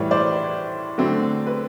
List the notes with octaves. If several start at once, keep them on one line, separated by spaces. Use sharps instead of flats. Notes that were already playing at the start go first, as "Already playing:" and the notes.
Already playing: A2 E3 G3 B4 C#5
C5 D5
D3 F#3 A3 C4
B4